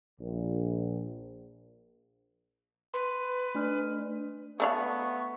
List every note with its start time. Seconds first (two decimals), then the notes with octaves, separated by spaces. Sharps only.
0.21 A#1
2.94 B4 C6
3.55 A3 D4 F6
4.60 A3 B3 D4 F5 C#6